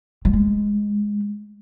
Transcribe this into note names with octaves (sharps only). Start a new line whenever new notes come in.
F#3
G#3